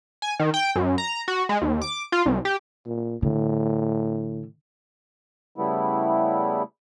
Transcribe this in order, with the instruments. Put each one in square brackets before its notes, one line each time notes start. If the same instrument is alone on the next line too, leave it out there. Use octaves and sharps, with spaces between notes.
[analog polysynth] G#5
D#3
G5
F#2
A#5
F#4
G#3
D#2
D6
F4
C2
G4
[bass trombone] A#2
[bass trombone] A2 [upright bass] D3
[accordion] C#3 G3 A3 B3 E4